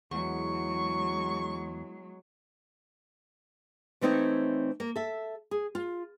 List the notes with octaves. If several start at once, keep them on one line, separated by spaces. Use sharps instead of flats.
E2 F#3 G#3 C#6
E3 A3 C4 D#4 C#5
A#3
A4 E5
G#4
F4